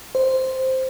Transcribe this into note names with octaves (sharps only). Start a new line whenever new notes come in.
C5